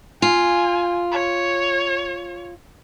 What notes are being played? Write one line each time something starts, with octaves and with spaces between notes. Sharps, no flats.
F4 G#5
C#5